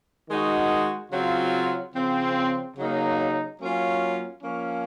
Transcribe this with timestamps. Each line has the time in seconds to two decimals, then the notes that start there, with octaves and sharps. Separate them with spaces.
0.29 D#3 G#3 D#4 F#4
1.12 C#3 F#3 C4 F4
1.94 C#3 F3 C4
2.77 C#3 F#3 A#3 D#4
3.59 F#3 A#3 C#4 F4
4.42 F3 A#3 C#4